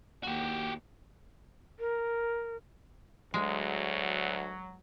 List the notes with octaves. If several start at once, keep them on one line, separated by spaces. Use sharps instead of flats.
D#2 F#4 G4
A#4
D2 F#3 G#3